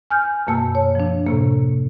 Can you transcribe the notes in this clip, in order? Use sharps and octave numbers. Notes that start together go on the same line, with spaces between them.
G#5 F6 G6
F#2 B2 A#3 A5 E6
C#5
F3 D4
A2 C3 A#3